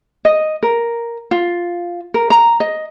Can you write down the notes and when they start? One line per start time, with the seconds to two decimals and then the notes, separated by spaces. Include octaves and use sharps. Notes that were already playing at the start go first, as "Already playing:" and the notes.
0.25 D#5
0.63 A#4
1.31 F4
2.14 A#4
2.30 A#5
2.60 D#5